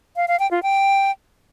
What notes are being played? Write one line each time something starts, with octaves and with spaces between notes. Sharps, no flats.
F5
F5
G5
F4
G5